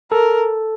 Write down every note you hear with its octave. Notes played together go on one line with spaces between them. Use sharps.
A4 A#4